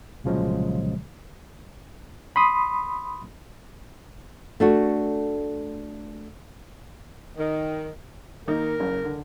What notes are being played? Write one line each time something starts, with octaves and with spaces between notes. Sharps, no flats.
C2 A#2 C#3 F3 F#3 G#3
B5 C6 D#6
A3 D4 F#4
D#3
D#3 A#3 D#4 A#4
F#1 C#3
D3